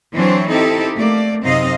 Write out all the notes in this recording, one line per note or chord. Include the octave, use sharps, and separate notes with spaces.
E3 F#3 C4 D4 C5 C#5
C4 D#4 E4 G4 A4
A3 A#3 D5
F#2 C3 C4 D#4 D#5 F5